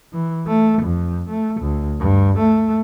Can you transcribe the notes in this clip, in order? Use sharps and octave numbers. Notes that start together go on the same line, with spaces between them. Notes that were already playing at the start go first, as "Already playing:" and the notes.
E3
A3
F2
A3
D2
G2
A3